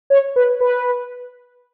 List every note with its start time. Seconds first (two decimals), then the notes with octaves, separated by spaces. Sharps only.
0.10 C#5
0.36 B4
0.60 B4